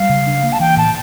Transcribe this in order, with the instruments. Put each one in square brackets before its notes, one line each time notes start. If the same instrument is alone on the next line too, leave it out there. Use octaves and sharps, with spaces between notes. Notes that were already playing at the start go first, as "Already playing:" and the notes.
Already playing: [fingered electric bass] G3 [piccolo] F5
[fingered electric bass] C#3
D4
A#3
[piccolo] A5
[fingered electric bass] E3 [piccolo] G5
[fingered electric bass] A2 [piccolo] A5